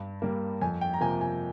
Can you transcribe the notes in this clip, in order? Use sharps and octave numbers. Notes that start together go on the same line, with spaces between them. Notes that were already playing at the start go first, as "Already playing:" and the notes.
Already playing: G2
G3 A#3
F2 G#5
G5
A#5
C3 F3 A#3 G#5
G#5